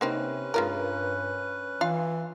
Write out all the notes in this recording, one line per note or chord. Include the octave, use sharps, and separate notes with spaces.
C3 A#3 C4 C#4 D#4 B4 F#6
G2 G#3 F4 A#4
E3 F4 F5